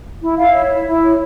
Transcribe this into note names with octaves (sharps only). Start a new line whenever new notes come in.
E4
E4 F5
C#5 E5
E4
E4
C#5